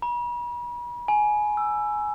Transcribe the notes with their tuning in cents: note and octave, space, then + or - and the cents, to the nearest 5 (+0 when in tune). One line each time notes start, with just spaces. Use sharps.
B5 -45
G#5 +15
E6 +10